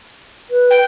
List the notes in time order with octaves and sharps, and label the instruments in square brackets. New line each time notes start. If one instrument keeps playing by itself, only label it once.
[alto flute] B4
[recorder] G5